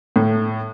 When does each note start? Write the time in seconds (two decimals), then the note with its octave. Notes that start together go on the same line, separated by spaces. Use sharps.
0.16 A2